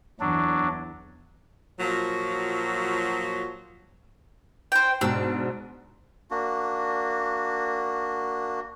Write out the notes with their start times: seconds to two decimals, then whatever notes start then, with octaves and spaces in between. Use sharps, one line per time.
0.20 E2 F#3 D4
1.80 A#2 F3 F#3
4.72 C5 G5
5.01 G#2 B2 D4 E6
6.30 A#3 D4 F#4